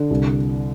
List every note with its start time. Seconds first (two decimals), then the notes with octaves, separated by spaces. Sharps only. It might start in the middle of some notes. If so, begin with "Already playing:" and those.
Already playing: D3
0.10 C2